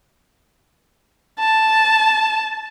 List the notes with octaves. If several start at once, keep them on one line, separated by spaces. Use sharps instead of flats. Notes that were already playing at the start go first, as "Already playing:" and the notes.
A5